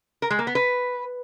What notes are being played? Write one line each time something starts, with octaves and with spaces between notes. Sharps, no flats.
A#4
G#3
A#3
B3
B4